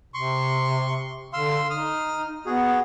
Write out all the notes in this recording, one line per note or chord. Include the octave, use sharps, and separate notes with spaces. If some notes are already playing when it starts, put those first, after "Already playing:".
C3 C6 C#6
D3 F5 C6 E6
D#4 D#6 F6
B3 F#4 G#4